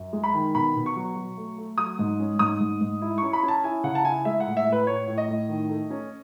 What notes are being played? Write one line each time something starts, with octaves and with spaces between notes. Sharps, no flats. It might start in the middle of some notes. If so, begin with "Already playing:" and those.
Already playing: F#2
G#3
B5
D#3
B2 B5
B2
C#6
F#3
F#3
A3
A3
F#3 D#6
G#2
C#4
G#2 D#6
G#2
G#2
E4
C#6
C#4
B5
C#4
A5
E4 G#5
C#3 F#5
A5
E4 G#5
G#3 E5
F#5
A2
E5
A2
B4
A2 C#5
A2
D#5
A2
D#3
A3
C#4